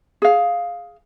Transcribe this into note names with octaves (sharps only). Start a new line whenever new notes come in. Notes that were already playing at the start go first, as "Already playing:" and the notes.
G#4 F5